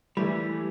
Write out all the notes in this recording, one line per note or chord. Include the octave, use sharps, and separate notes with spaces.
E3 G3 A3 E4